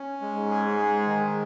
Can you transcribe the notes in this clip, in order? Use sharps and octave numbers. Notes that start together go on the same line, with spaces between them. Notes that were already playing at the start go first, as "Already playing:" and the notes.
Already playing: C#4
G#3
G#2
G#4
G#3
D#3